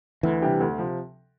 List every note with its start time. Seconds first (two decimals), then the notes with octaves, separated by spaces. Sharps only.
0.23 D2 E3
0.42 C3 G3 D4 G4
0.60 D2
0.78 C3 F3